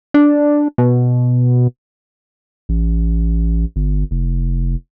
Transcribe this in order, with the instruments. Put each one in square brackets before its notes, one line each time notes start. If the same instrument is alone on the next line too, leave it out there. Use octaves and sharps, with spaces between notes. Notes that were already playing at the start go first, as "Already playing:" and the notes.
[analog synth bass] D4
B2
[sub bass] A1
G1
F1